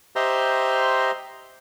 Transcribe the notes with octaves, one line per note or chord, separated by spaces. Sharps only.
G4 C5 D#5 E5 A#5 C6